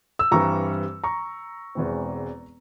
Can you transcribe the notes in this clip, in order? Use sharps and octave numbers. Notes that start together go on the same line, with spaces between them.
E6
G2 E3 G3 C4 A#5 C#6
A#5 C#6
E1 E2 E3 G#3 C4